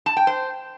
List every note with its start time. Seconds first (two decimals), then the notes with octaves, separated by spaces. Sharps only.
0.06 A5
0.17 G5
0.27 C5